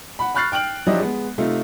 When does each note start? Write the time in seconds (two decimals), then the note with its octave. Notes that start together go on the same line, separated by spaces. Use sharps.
0.19 F#5 B5
0.35 B5 C#6 F6 F#6 A6 C7
0.52 G5 F6 D7 F#7
0.87 F3 F#3 D4 E4 G4 D#5
1.00 G#3 B3
1.38 C3 A3 D#4 F4